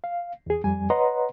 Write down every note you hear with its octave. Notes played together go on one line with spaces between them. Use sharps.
F5
E2 G#4
F2 G3 G#5
B4 C#5 D#5 F#5 A#5 C6